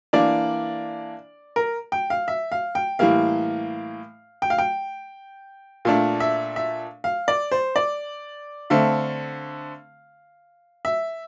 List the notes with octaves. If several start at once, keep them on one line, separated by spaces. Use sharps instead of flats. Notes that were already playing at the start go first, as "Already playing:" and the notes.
E3 A#3 D4 D5
A#4
G5
F5
E5
F5
G5
A2 E3 G3 A#3 F5
G5
F5
G5
A#2 A3 D4 F5
E5
E5
F5
D5
C5
D5
D3 A3 C4 F5
E5